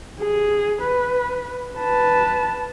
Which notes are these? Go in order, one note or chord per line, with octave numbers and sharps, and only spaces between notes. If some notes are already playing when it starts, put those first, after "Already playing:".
G#4
B4
B4 A5